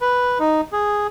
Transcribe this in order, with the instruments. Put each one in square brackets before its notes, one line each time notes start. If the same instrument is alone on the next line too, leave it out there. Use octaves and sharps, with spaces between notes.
[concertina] B4
D#4
G#4